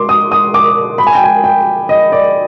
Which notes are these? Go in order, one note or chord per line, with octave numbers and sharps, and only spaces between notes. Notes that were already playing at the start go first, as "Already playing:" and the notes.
Already playing: C6 D6
D#6
D#6
D6
B5
G#5
G5
G#5
G5
D#5
D5